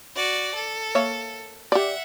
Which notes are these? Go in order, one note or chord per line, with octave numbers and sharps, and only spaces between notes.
F#4 D5
A4
A#3 C#5 E5
G4 D5 E5 F#5